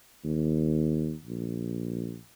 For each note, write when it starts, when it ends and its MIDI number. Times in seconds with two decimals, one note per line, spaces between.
0.24 1.14 39
1.25 2.17 34